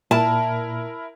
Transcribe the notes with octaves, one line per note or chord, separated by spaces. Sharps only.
A#2 E4 A#4 A5